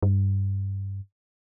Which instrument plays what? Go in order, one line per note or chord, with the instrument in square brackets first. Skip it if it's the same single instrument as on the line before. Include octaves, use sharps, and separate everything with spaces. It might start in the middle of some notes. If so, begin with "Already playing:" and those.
[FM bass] G2